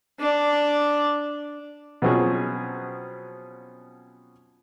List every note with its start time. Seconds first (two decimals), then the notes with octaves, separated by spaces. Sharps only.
0.20 D4 D5
2.02 B2 F3 F#3 C4 C#4 G#4